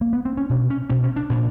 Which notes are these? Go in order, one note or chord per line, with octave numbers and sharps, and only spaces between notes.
A#3
B3
C4
C#4
B2 D4
C#4
B2 C#4
C#4
D4
A#2 D4